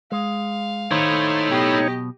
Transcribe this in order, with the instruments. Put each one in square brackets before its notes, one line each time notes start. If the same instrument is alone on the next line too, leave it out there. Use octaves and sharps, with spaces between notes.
[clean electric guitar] G#3 [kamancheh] F5
[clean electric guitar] D#3 C5 [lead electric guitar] A3 E4 [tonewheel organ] D#4 C#5
[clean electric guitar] B1 B2 [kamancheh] G4 D#5